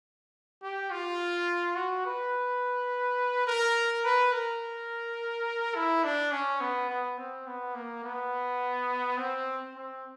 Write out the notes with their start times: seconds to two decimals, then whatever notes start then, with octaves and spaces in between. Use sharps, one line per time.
0.62 G4
0.91 F4
1.76 F#4
2.05 B4
3.47 A#4
4.05 B4
4.32 A#4
5.75 E4
6.04 D4
6.32 C#4
6.60 B3
6.89 B3
7.18 C4
7.47 B3
7.75 A#3
8.04 B3
9.17 C4
9.75 C4